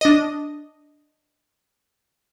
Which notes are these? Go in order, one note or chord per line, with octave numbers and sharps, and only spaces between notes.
D4 D#5